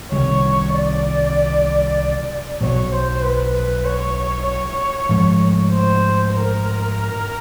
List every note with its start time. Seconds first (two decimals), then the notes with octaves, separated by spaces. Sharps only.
0.12 C2 C3 D#3 G3 C#5
0.75 D5
2.60 B1 B2 F#3 C#5
2.92 C5
3.23 B4
3.54 B4
3.85 C#5
4.47 C#5
5.09 G#2 F3 A3
5.72 C5
6.33 A#4